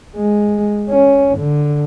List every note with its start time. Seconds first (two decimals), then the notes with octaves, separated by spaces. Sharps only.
0.16 G#3
0.89 C#4
1.38 D3